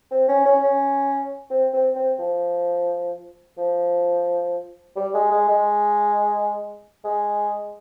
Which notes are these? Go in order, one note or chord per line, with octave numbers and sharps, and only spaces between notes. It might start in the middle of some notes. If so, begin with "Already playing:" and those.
C4
C#4
C#4
C#4
C4
C4
C4
F3
F3
G3
G#3
G#3
G#3
G#3